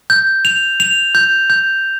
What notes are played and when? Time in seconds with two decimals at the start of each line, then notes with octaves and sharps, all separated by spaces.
0.10 G6
0.45 F7
0.80 F7
1.15 G6
1.50 G6